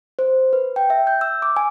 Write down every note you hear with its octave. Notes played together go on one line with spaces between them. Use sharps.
C5
B4
G5
E5
G6
E6
D6
G#5